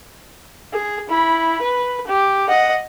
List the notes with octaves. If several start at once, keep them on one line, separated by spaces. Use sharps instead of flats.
G#4
E4 B5
B4
G4
D#5 F#5